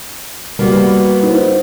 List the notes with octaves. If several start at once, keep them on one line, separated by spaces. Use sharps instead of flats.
G3 A#3 B3 F#4
D#4 C5